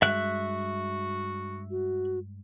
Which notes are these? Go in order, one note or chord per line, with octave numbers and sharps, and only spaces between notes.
G2 G#3 F#4 E5 F#6
F#4